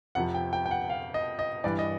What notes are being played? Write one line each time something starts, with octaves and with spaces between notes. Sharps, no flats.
F2 C3 F3 F#5
G5
G5
G5
F#5
F5
D#5
D#5
G2 E3 D5
D#5